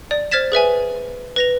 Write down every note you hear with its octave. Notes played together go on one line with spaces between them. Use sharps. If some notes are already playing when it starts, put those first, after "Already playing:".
D5
C5 F6 G#6 A6 B6 E7
G#4 B4 E5 G#5
B4 A#6 F7